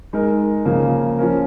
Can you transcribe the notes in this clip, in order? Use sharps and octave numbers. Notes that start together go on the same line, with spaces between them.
G#3 D#4 A#4
C#3 F3 A#3
F3 C#4 A#4